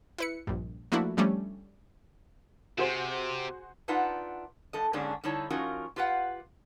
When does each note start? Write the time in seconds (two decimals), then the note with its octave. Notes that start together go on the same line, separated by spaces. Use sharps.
0.18 E4 B4 C#7
0.47 A#1 G2
0.92 F3 A3 A#3 D4 E4 F#4
1.17 F3 G3 A3 C#4 D4
2.78 C3 F#4 G#4 C5
3.88 D4 D#4 F4 B4 E5 F#5
4.73 G2 A4 D#5
4.93 G#2 D3 A#3 C#4 D4 G#4
5.24 D3 G3 D#4 E4 C#5 A5
5.50 F3 C#4 D#4 F4 F#4 A#4
5.96 F4 G4 B4 F5 F#5